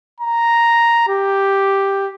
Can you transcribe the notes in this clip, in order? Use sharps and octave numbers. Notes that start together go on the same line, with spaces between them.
A#5
G4